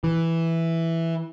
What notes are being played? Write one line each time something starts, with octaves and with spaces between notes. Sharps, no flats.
E3